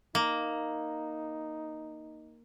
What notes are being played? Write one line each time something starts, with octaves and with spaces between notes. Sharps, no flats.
A#3 D#4